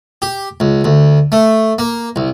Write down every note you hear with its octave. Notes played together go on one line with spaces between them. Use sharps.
G4
C#2
D2
A3
A#3
C2